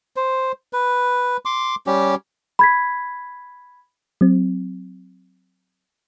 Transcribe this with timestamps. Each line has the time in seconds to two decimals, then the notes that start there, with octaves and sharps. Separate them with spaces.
0.16 C5
0.73 B4
1.45 C6 D6
1.87 G3 C#4 G4
2.59 B5 G#6 B6
4.21 F#3 C4